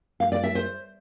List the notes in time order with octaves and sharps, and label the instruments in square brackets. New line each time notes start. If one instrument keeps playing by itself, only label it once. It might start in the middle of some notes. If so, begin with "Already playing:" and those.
[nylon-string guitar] F5
D5
E5
C5